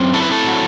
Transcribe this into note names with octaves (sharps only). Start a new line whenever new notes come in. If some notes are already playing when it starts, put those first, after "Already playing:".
Already playing: F#2 C4
E4 A4
B4
A4
F#3